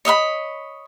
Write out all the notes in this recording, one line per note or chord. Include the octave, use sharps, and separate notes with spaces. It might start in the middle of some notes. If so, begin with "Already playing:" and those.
C#5 D#5 E5 B5